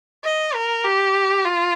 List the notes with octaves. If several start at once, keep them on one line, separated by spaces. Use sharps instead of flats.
D#5
A#4
G4
F4